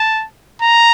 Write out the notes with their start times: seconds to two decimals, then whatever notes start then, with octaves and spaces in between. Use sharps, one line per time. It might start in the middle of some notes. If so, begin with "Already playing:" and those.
Already playing: A5
0.62 A#5